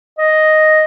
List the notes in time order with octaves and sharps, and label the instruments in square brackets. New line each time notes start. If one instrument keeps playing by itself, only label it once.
[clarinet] D#5